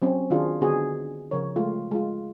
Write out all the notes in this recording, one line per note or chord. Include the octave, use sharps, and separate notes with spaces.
F#3 C4 C#4
D#3 D4 F4 F#4 G#4
D3 B3 D4 F#4 G#4
C#3 F3 A#4 C#5
G#3 A3 F4
G#3 F4